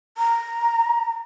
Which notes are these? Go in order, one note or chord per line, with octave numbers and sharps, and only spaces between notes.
A#5